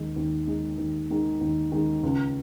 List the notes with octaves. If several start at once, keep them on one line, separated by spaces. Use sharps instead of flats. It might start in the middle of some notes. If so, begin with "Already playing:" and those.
Already playing: D#2 D#3 G#3
D#2
D#3 G#3
D#2
D#3 G#3
D#2
D#3 G#3
C#2